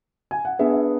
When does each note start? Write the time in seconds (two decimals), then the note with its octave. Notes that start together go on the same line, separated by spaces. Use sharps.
0.31 G#5
0.45 F#5
0.59 B3 D4 G#4 B4 E5
0.73 E5